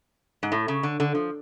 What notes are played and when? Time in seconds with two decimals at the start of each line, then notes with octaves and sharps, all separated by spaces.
0.43 G#2
0.52 A2
0.68 C#3
0.83 D3
1.00 D3
1.15 F3